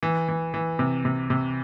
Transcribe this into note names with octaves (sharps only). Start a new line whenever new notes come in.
E3
E3
E3
C3
C3
C3